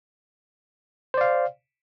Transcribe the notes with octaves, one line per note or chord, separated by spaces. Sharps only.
C5 D5 F5